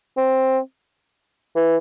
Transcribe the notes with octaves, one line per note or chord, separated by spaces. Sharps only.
C4
E3